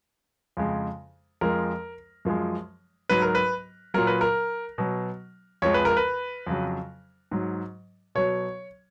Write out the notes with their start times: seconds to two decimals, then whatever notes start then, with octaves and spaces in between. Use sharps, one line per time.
0.57 F2 C#3 G#3
1.41 F2 F3 G#3 A#4
2.25 F#2 F3 G#3
3.09 G#2 F#3 B4
3.22 A#4
3.35 B4
3.94 A#2 F#3 A#4
4.07 B4
4.21 A#4
4.78 B2 F#3
5.62 F2 F3 G#3 C#5
5.74 B4
5.85 A#4
5.97 B4
6.47 F2 C#3 F#3
7.31 G#2 F#3
8.15 B2 F#3 C#5